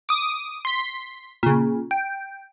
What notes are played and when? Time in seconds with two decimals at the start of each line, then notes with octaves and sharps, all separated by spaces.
0.09 D6 D#6
0.65 C6 B6
1.43 A#2 C#3
1.91 G5